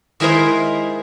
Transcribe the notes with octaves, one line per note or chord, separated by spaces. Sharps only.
D#3 G#3 E4 A#4 C5